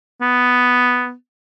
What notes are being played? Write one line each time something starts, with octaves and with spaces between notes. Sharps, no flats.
B3